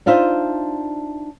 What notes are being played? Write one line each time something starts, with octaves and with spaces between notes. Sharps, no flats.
D4 D#4 F4 C5 E5